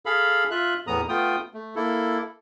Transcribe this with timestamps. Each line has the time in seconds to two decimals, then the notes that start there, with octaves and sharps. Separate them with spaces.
0.06 G#4 A4 F5 B5
0.51 F4 E5 F#6
0.87 E2 A2 E3 B3 A#5 D#6
1.09 A3 B3 F4 G5 D#6
1.54 A3
1.76 A#3 E4 A4